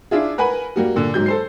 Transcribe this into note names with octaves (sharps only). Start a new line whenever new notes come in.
D4 E4 F4 G#4
A#4 B4 F#5 G#5 B5
G3 A#3 F#4
A#2 D3
G#2 F#3 G6
A4 C5 C7